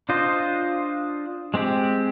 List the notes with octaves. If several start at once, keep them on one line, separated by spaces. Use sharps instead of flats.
D4 F4 C5 D#5
G#3 C4 G4